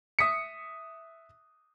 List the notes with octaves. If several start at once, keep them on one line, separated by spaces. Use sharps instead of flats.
E5 D#6 B6 C#7